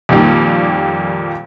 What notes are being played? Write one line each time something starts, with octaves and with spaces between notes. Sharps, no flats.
F2 A#2 D#3 G3 A#3